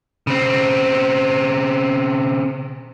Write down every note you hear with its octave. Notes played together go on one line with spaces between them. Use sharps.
C#3 C4